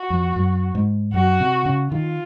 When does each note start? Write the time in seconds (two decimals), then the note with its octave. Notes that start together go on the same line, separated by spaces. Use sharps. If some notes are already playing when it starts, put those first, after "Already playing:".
Already playing: F#4
0.10 F2
0.36 F#2
0.75 G#2
1.14 F#2 F#4
1.40 C3
1.66 C#3
1.92 D#3 F4